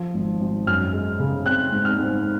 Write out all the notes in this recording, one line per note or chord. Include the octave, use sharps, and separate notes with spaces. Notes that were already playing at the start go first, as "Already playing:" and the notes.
Already playing: F3
G#1
G#1
F#2 F6
G#3
C#3
C4 F#6
G#2
F6
G#2